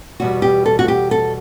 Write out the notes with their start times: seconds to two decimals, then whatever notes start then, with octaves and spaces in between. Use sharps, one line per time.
0.20 E2 B2 G3 F#4
0.42 G4
0.66 A4
0.79 F#4
0.88 G4
1.11 A4